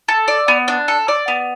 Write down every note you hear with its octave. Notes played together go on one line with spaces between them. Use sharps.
A4
D5
B3
D4
A4
D5
B3